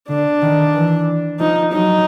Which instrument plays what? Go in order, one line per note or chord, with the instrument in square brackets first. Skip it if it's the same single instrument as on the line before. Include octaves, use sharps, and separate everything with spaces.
[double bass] D3 [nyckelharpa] D4
[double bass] D#3
E3
[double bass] F3 [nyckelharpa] D#4
[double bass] F#3 [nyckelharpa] D#4